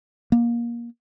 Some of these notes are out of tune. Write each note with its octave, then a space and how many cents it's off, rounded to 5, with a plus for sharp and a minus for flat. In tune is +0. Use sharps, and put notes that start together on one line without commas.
A#3 +20